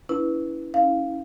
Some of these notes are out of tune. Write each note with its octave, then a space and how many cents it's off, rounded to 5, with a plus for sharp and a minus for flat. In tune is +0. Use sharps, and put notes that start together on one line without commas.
C#4 +40 E4 +0 B4 +0
C#4 +0 E4 -30 F5 +0